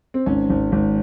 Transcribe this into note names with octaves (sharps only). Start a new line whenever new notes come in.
C4
G#1 C#4
G#1
G#1